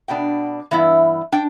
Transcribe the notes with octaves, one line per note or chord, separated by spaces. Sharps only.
B2 B3 D4 G5
G2 E3 B3 E4
D4 G5